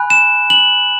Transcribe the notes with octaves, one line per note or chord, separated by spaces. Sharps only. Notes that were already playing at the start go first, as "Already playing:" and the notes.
Already playing: G#5 B5 F#6
E7
F#7